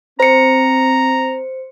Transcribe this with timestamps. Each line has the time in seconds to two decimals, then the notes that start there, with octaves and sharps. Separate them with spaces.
0.20 C4 C5 A#5 C#7